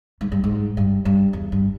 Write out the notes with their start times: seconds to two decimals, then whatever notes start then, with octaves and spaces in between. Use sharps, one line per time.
0.21 G#2
0.32 G2
0.44 G#2
0.77 G2
1.05 G2
1.33 E2
1.52 G2